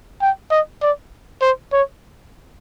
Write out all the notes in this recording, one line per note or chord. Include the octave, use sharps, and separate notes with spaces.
G5
D#5
D5
C5
C#5